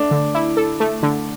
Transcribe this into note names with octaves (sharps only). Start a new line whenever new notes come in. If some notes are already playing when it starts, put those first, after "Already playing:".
Already playing: A3 D4
D3
E4
A4
A3
D3